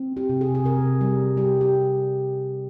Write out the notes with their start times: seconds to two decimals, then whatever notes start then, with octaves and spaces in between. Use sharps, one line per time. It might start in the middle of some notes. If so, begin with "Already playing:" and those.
Already playing: C4
0.17 G4
0.29 C3
0.41 G#4
0.55 G#4
0.64 C3 A#4
1.01 G3
1.37 G3 G4
1.61 G4